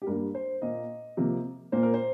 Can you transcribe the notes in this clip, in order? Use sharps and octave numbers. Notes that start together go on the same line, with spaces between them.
G4
G2 G3 A#3 A#4
C5
A#2 A#3 D#5
C3 F3 A#3
A#2 A#3 C5
A#4
C5